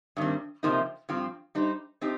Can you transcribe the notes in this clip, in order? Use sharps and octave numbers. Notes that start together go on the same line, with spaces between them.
G2 D#3 G3 C4
C3 F3 A#3 D#4 C5
G2 F3 C4 F4
G3 D#4 C5
F3 C4 D#4 G4